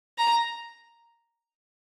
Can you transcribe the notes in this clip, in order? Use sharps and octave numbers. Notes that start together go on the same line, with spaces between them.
A#5